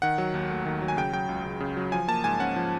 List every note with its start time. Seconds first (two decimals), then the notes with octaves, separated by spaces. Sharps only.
0.02 D#3 F#5
0.18 F#3
0.34 D#2
0.50 A3
0.66 D#3
0.82 F#3
0.88 G#5
0.97 C#3 G5
1.13 F#3 G5
1.29 C#2
1.44 C#2
1.60 C#3
1.77 F#3
1.92 F3 G#5
2.08 A#3 A5
2.24 G#2 G#5
2.40 C#4 F#5
2.56 F3